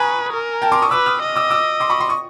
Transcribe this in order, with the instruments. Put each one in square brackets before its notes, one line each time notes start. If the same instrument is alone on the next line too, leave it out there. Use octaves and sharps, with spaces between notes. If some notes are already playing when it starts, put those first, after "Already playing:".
Already playing: [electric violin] B4 [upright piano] G#5 A#5 C#6 D#6
[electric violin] A#4
[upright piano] G5 A5
C6 D6
C#6 D#6
[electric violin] B4 [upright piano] D6 E6
[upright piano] D#6 F6
[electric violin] D#5
[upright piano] D6 E6
D6 E6
C6 D6
B5 C#6
C6 D6
C#6 D#6